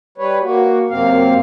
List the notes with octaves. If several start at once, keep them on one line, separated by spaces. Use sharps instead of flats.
G3 B4 C#5
A#3 F#4
F#2 C3 A#3 C4 F5